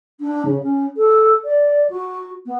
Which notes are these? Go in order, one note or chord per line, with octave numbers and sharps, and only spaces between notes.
D4
C#3
C#4
A4
D5
F#4
B3